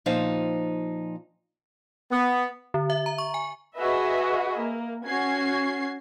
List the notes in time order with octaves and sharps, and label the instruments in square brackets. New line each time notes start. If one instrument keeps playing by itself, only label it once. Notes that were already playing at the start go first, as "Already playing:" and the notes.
[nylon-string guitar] A#2 F3 D#4 C5 F5
[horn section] B3
[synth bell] D3
E5
A#5
C#6
G#5
[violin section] F#4 G#4 B4 D#5 E5
A#3
C#4 F#4 G#6 C7